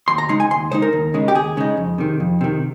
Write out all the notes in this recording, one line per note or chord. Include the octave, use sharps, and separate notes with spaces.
D#2 C6
A#5
C#3 G#3 D#4 C6
G#5
D#2 C6
C#3 G#3 D#4 C5
A#4
D#2
C#3 G#3 D#4
G4
D#2 G#4
C#3 G#3 D#4
F2
C3 D#3
F2
C3 D#3